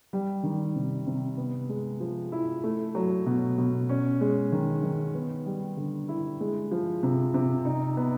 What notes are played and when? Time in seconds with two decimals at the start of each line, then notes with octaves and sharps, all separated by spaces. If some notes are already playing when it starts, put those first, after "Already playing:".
0.13 G3
0.43 D#3
0.75 C3
1.07 C3
1.37 B3
1.69 G#3
2.00 F3
2.32 E4
2.64 A3
2.95 F#3
3.26 B2
3.58 B2
3.89 C#4
4.21 G#3
4.52 D#3
4.83 D#3
5.15 B3
5.46 G3
5.77 D3
6.09 E4
6.40 G#3
6.71 F3
7.03 C3
7.34 C3
7.65 D#4
7.97 B3